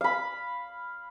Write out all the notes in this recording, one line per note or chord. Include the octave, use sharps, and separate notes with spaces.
F5 B5